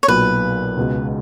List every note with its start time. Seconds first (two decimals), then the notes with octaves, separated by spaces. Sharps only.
0.03 C#5
0.08 B1 A#2 F#3 B4
0.77 C#2 B2 G#3